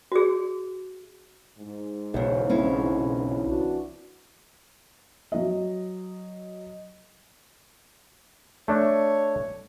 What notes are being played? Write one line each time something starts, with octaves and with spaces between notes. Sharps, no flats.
F#4 G#4
G#2
B1 E2 C#3
C4 C#4 E4
E3 D4 F#4
F#3 D#5
A3 D4 C#5